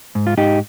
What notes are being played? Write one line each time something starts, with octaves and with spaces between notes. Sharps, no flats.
G#2
F4
G#2 D#4 G4